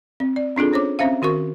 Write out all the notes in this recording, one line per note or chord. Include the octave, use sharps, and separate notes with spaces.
C4
D5
C4 D4 F4 G#4 A4
C#4 C5 C#5 D6
C4 C#4 C5 E5 F5
D#3 F#4 A#4 C#6